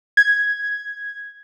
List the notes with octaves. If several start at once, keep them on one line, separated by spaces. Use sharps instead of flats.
G#6